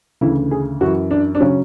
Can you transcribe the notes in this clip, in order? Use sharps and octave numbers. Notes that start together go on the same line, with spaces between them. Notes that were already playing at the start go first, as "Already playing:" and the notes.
D2 C#3 E3 E4
G#4
F#2 E3 F#4
D4
D4
C#3 F#3 C#4